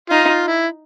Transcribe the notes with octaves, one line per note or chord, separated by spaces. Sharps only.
D#4 F4
F4
E4